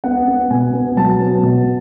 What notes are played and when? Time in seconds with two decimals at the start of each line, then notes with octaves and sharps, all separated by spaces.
0.04 B3 F#5
0.28 B3
0.50 B2 G#5
0.74 B3
0.97 F#3 A5
1.20 B3
1.43 B2